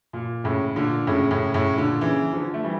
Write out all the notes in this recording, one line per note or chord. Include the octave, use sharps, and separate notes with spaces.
A#2
A2 C#3
A#2 D3
A2 C#3
A2 C#3
A2 C#3
A#2 D3
C#3 E3
D3 F3
A3
E3 G3